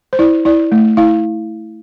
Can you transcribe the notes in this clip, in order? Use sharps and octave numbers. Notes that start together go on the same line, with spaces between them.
C5
E4 D5
E4 D5
A3
E4 F5